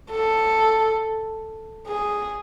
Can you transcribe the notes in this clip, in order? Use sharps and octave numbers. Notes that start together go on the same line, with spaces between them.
A4
G#4